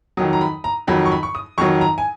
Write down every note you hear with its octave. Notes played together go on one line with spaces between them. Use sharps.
F2 D#3 F#3 D#6
A#5
B5
A#5
F2 D#3 F#3 B5
C#6
B5
C#6
D#6
F2 D#3 F#3 C#6
A#5
G#5